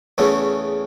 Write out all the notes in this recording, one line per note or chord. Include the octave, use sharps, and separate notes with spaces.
E2 C#3 E3 A3 C#4